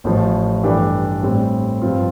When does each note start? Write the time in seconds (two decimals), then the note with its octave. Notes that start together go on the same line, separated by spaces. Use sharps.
0.04 A1 A2 F3
0.63 G2 E3 A3 D4 G4
1.23 A2 G3 C4
1.82 G2 F3 C4 F4